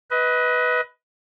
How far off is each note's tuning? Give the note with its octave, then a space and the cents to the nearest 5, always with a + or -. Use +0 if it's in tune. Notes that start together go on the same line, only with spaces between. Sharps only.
B4 +0 D#5 +30